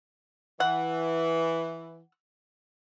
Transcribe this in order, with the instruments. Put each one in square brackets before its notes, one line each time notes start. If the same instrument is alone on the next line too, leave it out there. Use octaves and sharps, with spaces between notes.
[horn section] E3 [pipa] F#5